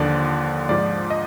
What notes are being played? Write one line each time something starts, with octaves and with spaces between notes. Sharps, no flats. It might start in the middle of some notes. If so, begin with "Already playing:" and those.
Already playing: D#2 D3 F3 D5
G#2 F3 D5
D#5